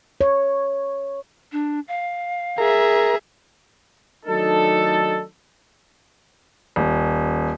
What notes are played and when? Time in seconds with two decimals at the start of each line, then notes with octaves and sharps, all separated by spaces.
0.21 C#5
1.52 D4
1.88 F5
2.58 G#4 A#4 E5 A#5
4.26 D#3 F#3 A3 D4 D#4 A4
6.76 D#1